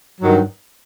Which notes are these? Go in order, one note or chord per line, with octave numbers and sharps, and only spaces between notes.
G2 D#3 F#3